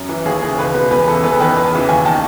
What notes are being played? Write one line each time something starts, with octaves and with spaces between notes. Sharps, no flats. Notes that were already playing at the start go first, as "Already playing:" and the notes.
Already playing: F#2
E3
D#2 G#4
C#3 E3 G#4
C#2 B4
B2 B4
E2 B4
C#3 E3 A4
E2 B4
A4
D#3 B4
E2
C#3 E3
D#2 G#5
D#3 A5